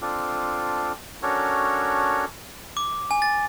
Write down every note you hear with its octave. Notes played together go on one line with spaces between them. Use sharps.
C4 D4 F4 A4
C#4 D4 F#4 A4 A#4 C#5
D6
G#5
A6